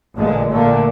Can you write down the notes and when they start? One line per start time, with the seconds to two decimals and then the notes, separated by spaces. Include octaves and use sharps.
0.17 A1 A#2 D3 G#3
0.50 A#2 D3 A3 A#3